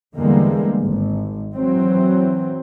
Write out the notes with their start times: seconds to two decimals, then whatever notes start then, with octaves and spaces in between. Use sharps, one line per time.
0.16 E2 D3 G3 G#3 A#3
0.84 G#1
1.55 E3 F#3 C4